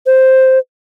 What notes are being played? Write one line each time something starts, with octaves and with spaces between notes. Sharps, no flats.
C5